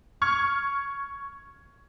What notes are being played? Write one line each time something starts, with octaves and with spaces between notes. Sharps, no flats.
C#6 F6 G#6 C#7